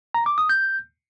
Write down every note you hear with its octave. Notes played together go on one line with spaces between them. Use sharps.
A#5
D6
D#6
G6